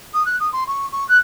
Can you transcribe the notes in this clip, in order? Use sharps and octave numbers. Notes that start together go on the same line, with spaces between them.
D#6
F#6
D#6
C6
C#6
C#6
F#6